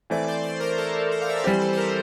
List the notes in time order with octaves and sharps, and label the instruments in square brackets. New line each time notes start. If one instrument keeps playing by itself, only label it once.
[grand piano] E3 A3 C4 [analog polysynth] D5
[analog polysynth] C5
C5
A#4
A4
A#4
F5
E5
D5
[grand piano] E3 G3 C4 G4 [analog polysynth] C5
[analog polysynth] A4
C5
A#4